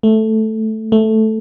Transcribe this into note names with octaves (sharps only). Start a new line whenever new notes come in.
A3
A3